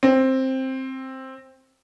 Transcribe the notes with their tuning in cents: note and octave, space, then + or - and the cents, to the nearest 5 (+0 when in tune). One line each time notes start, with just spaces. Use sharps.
C4 +10